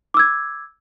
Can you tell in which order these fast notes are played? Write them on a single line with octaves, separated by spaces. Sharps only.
D6 E6 G#6